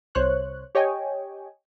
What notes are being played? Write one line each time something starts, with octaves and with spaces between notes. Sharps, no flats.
C2 C5 C#5 F#6
G4 C#5 D#5 G5 G#5